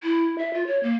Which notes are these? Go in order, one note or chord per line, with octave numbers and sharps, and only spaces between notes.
E4
E5
F4
C#5
A#3